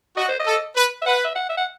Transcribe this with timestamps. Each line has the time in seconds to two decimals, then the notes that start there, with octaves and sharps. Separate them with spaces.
0.17 F#4 D#5
0.28 C5
0.40 D#5
0.47 A4
0.76 B4
1.02 E5
1.06 B4 F#5
1.24 E5
1.35 F#5
1.49 E5
1.57 F#5